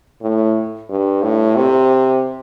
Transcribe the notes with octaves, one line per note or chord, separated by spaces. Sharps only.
A2
G2
A2
C3